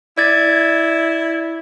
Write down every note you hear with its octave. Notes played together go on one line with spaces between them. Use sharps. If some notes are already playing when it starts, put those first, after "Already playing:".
E4 D5 G#6 A6